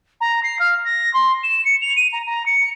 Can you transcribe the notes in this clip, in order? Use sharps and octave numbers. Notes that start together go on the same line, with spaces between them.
A#5
C7
F5
A#6
C6
E7
C#7
F7
D#7
A#5
A#5
C#7